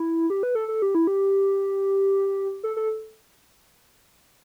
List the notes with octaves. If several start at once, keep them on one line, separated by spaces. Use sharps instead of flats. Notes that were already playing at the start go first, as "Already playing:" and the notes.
Already playing: E4
G4
B4
A4
A4
G4
E4
G4
A4
A4